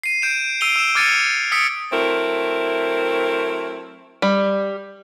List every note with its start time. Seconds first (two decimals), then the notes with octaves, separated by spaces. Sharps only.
0.04 C7 D#7
0.22 G6 D7 E7
0.61 E6 C7 D7 D#7 F7 G7
0.76 E6 E7
0.95 D6 F6 G#6 A6 C#7 D#7
1.52 D#6 E6 B6 C#7 D7
1.91 F#3 A3 C4 E4 A#4
4.22 G3